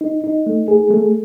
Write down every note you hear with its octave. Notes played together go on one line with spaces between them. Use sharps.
D#4
D#4
A3
G#4
A3